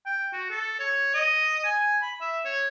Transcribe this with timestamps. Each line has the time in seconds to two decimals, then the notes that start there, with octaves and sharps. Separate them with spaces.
0.06 G5
0.33 F#4
0.50 A4
0.80 C#5
1.14 D#5
1.64 G#5
2.02 B5
2.21 E5
2.45 C#5